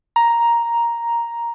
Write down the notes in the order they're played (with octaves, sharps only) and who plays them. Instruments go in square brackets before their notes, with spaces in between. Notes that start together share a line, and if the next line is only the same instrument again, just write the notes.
[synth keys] A#5